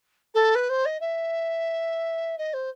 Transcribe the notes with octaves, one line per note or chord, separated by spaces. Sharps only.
A4
B4
C5
D#5
E5
D#5
C5